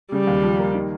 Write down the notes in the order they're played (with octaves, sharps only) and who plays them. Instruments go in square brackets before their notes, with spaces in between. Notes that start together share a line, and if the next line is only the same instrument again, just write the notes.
[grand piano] C#3 [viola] G3
[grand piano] D#2
F3
A#3
D#3